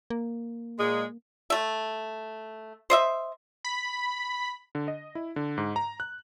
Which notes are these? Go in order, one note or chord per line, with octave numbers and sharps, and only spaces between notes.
A#3
A#2 G#3
A3 E5
C5 D#5 E5
B5
D3
D#5
E4
D3
G#2
A#5
F#6